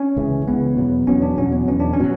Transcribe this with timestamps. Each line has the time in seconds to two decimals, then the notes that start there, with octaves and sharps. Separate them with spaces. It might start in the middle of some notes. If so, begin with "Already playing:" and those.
Already playing: C#4
0.16 C#2 C#3 E3
0.47 C#2 C#3 E3 B3
0.77 E2 B2 F#3
1.07 E2 B2 F#3 C#4
1.22 D4
1.38 E2 B2 F#3 C#4
1.53 B3
1.68 E2 B2 F#3 C#4
1.80 D4
1.93 C#4
2.00 B2 F#3